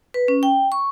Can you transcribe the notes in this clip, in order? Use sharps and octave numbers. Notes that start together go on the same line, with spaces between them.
B4
C#4
G5
C#6